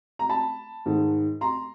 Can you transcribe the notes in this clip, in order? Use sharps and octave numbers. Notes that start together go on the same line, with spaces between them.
A#5
A5 B5
G#2 D#3 G#3
A#5 C6